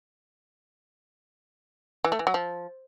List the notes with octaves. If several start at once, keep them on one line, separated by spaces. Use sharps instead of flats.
E3
A3
E3
F#3
F3